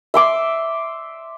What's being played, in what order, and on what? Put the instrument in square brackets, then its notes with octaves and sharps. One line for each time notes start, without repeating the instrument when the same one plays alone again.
[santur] E5 C6 D6